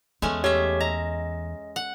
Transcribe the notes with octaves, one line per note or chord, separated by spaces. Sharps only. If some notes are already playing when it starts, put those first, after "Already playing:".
E2 G#3 A3 C#4
C#4 G4 C#5 E5
D#5 A#5
F#5